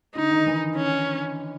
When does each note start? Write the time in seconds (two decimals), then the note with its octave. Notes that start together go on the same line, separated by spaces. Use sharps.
0.15 D3 D#4
0.31 D#3
0.46 E3
0.76 C#4